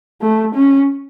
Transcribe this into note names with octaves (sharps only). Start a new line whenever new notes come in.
A3
C#4